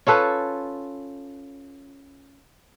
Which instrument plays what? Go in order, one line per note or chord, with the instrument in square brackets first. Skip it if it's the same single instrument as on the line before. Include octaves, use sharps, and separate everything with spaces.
[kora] C#4 F4 A4 B4